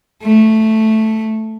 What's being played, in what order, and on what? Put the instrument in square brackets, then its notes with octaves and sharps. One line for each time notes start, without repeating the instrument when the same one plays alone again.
[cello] A3